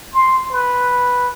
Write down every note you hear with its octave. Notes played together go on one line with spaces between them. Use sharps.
C6
B4